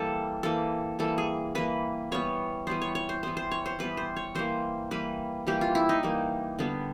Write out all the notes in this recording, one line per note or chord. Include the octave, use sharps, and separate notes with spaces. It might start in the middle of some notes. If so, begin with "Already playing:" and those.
Already playing: E3 G3 A#3 A4
E3 G3 A#3 A4
E3 G3 A#3 A4
G#4
E3 G3 A#3 B4
E3 G3 B3 C#5
E3 G3 B3 C5
C#5
C#5
C5
E3 G3 B3 C5
C5
C#5
C5
E3 G3 B3 B4
C5
C#5
E3 G3 A#3 C5
E3 G3 A#3 B4
E3 G3 A#3 G4
F4
E4
D#4
E3 G3 A#3
D3 G3 B3